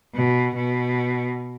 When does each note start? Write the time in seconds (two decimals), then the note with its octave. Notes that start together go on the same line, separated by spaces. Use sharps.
0.14 B2
0.55 B2